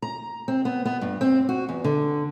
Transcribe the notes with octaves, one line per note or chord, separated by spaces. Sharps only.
A#5
C4
B3
B3
G2
C4
F#4
E2
D3